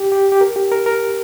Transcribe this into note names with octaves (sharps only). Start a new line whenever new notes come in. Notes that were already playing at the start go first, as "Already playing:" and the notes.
Already playing: G4
G4
G4
A#4
G4
A#4
A#4